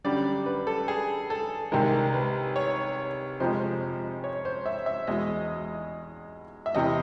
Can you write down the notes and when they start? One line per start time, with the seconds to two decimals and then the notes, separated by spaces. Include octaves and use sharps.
0.04 F#2 D3 G3 D5
0.46 B4
0.67 A4
0.88 G#4
1.30 A4
1.72 C2 C3 D#3 G#3 A#4
2.14 B4
2.56 C#5
3.40 F2 C3 F3 G#3 C5
4.24 C#5
4.45 C5
4.66 E5
4.86 E5
5.07 E2 B2 G#3 D#5
6.66 E5
6.75 E2 C3 E3 D#5